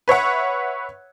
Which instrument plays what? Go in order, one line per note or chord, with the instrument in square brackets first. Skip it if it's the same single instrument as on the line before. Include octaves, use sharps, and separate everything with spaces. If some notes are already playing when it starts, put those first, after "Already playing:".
[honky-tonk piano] B4 C#5 E5 F#5